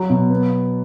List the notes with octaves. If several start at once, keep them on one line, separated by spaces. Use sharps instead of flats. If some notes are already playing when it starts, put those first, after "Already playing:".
Already playing: F#3
B2
B3